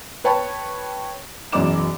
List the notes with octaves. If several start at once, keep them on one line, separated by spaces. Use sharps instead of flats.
B4 C#5 G5 A5 B5 C#6
E1 F#2 D5 D#5 D6 E7